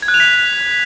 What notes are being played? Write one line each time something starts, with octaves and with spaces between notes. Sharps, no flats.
G#6
F#6
F7
B6